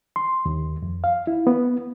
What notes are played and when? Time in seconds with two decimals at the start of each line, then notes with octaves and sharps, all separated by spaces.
0.16 C6
0.46 D#2
0.82 F2
1.04 F5
1.27 E4
1.47 B3